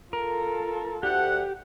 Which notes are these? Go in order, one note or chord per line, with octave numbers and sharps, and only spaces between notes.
F4 A4 A#4
D2 G4 F#5